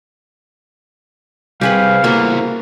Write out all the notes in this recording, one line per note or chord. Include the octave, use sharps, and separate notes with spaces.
C3 G3 G4 G#4 B4 F5
A#3 B3 E4 F#4 A4